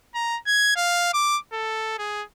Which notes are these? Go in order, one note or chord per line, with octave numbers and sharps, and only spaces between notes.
A#5
G#6
F5
D6
A4
G#4